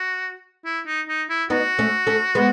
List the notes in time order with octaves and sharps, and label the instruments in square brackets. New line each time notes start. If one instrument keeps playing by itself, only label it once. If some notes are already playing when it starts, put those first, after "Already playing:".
Already playing: [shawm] F#4
E4
D#4
D#4
E4
[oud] B3 D#4 [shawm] F#4
[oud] A3 C#4
A3 C#4
G#3 B3